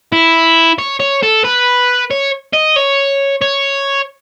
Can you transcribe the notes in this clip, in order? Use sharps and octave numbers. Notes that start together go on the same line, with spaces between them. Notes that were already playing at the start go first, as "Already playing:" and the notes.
E4
C#5
C#5
A4
B4
C#5
D#5
C#5
C#5